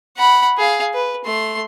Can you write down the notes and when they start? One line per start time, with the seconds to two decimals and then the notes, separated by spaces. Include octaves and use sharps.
0.17 F#5 B5
0.57 G#4 F5
0.94 B4
1.25 A3 C6